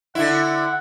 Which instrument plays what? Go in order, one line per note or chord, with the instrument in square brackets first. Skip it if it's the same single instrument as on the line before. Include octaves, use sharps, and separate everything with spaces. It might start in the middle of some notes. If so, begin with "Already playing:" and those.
[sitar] D3 E4 [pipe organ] F#5